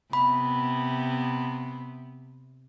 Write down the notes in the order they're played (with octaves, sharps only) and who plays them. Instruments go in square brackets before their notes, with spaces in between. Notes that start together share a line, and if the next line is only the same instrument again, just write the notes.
[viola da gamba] C3 B3 [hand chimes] B5